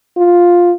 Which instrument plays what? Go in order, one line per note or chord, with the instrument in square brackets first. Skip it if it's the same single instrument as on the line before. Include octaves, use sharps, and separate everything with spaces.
[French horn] F4